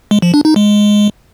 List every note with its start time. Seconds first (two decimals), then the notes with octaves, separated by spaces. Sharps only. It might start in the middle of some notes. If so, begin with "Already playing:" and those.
0.11 G#3
0.22 F3
0.34 D4
0.45 D#4
0.56 G#3